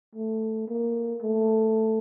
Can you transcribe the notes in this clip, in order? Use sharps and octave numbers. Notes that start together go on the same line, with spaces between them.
A3
A#3
A3